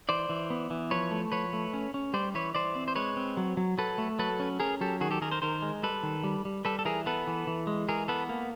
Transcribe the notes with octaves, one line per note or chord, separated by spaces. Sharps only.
E3 C5 D5
E3
B3
E3
F3 B4 C#5
A3
F3 B4 C#5
A3
C#4
C#4
G3 C5 D5
E3 B4 C#5
E3 C5 D5
C4
C5
G#3 B4 C#5
C4
F#3
F#3
F#3 A4 B4
A3
F#3 A4 B4
C#4
C#4 G#4 A#4
F#3 G4 A4
D#3 F#4 G#4
G4 A4
D#3 G#4 A#4
A#4 C5
D#3 A#4 C5
G#3
G3 A4 B4
D#3
G3
G3
G3 A4 B4
A4
E3 G#4 A#4
B3 A4 B4
E3
E3
G#3
E3 G#4 A#4
B3 A4 B4
A#3